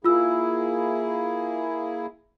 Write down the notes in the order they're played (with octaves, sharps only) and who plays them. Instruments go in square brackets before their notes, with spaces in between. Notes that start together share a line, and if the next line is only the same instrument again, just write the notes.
[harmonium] A#3 E4 G#4 [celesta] F4 E6